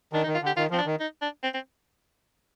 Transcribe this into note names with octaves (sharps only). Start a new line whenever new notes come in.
D#3 D4
D#4
D#3
F4
D3 G4
D#3 F4
F3 C4
D4
D#3
D#4
D4
C4
C4